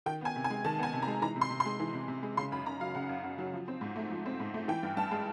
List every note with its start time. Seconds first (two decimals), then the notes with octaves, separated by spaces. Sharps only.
0.06 D#3 G5
0.21 B3 G#5
0.36 C3
0.44 G#5
0.50 G#3
0.64 D#3 A5
0.78 B3 G#5
0.93 C3
1.02 A#5
1.07 G#3
1.22 E3 A#5
1.36 C3
1.41 C6
1.51 C3
1.60 C6
1.66 G#3
1.80 E3
1.94 C3
2.08 C3
2.23 G#3
2.37 C#3 C6
2.52 F#2 B5
2.66 F#2 A#5
2.81 F#3 F5
2.95 C#3 F#5
3.09 F#2
3.24 F#2
3.38 F#3
3.53 F3
3.68 C4
3.81 G#2
3.96 A3
4.11 F3
4.26 C4
4.40 G#2
4.54 A3
4.68 E3 G5
4.83 G2
4.97 G2 A5
5.11 G#3